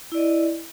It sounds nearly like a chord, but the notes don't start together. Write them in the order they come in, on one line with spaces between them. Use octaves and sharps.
E4 D5 D#5